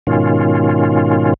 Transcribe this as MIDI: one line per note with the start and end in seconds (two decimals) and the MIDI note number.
0.07 1.34 44
0.07 1.34 47
0.07 1.34 51
0.07 1.34 61
0.07 1.34 65